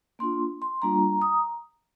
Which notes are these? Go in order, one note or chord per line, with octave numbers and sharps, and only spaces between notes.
A#3 D4 F4 C6
C6
G3 A#3 D4 F4 A#5
D#6